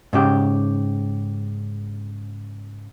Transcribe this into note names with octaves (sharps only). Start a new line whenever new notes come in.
G#2 C#3 G4